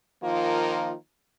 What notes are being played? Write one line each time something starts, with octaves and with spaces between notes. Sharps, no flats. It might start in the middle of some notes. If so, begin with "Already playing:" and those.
D#3 F3 A#3 F4